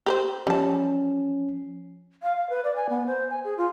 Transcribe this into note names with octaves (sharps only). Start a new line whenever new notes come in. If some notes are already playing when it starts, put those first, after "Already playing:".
G4 B4 C5
F3 G3 C#4 A5
F5
F5
B4
D5
G#5
B3
C5
G#5
G#4
F4